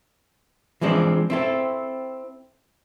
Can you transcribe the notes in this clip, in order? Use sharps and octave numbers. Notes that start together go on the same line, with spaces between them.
E3 F3 G#3 C4 D4
C4 E4 A4